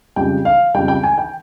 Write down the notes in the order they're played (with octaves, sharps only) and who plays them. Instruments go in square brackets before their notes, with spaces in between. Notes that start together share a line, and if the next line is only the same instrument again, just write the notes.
[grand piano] F2 C#3 G3 G5
F5
F2 C#3 G3 G5
G5
G#5
G5